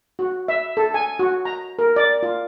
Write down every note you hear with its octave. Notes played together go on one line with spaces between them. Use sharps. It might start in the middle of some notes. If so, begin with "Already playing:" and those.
F#4
E5
A4
G#5
F#4
A#5
A#4
D5
F4